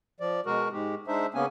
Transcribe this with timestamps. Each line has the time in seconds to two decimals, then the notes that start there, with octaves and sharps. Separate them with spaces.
0.20 F3 D5
0.46 B2 G#3 F#4 A#4
0.72 G#2 G#3 G4
1.07 G#3 D4 D#4 C5 E5
1.34 C#3 A#3 B3 C#4 G#5